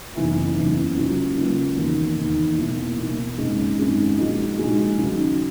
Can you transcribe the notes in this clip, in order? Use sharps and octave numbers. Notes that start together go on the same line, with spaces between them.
F#1 E2 C#3 E3
F#1 E2 C#3 E3
C#2 C#3 F#3 A#3
C#2 C#3 F#3 A#3
E1 D#2 D#3 A#3
E1 D#2 D#3 A#3
E2 B2 A#3 E4
E2 B2 A#3 E4
G#1 F#2 C#3 G#3 D#4
G#1 F#2 C#3 G#3 D#4
A#1 A#2 G#3 D#4 F#4
A#1 A#2 G#3 D#4 F#4
D#2 C#3 F#3